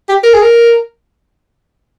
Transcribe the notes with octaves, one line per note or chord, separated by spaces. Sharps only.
G4
A#4
G#4
A#4